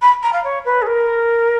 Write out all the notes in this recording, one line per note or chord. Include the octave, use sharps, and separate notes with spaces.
B5
A#5
F5
C#5
B4
G#4
A#4